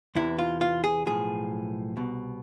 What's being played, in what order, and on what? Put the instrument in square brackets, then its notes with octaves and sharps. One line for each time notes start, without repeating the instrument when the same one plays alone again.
[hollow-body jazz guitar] E2 C3 E3 E4
F4
F4
G#4
B1 A2 F3 G#4
C2 B2